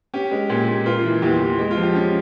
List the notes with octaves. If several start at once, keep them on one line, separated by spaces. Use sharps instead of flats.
C#4 G4
G#3
A#2 G4
A#2
A#3 F4
E3
E2 G4
E2
G#3
F4
F3
G4
C#4